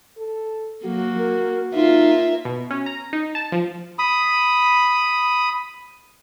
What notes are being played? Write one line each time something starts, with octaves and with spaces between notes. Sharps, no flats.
A4
F#3 A#3 F#4
A#4
A#3 D#4 F4 E5
B2
C#4
A#5
D#4
A5
F3
B5 D#6